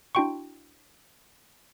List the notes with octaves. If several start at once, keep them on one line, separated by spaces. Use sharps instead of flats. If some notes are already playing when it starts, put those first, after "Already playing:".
D4 E4 F#4 G5 C6 C#6